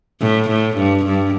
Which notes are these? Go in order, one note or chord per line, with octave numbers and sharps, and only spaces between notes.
A2
A2
G2
G2